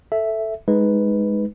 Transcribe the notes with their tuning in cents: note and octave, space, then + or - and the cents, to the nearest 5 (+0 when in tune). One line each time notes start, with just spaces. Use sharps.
A4 +0 E5 +0
G#3 +0 D#4 +0 B4 +0